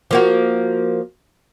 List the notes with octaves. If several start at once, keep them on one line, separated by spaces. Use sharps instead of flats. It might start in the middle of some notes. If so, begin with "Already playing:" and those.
F3 A#3 F#4